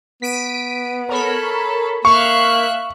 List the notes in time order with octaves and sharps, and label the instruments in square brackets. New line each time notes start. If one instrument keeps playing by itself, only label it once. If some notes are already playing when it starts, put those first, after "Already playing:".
[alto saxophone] B3 [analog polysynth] B6 D7 D#7
[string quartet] A4 [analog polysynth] A#4 C#5 B5
[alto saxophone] A#3 [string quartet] E5 F#6 [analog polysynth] F5 [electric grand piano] C#6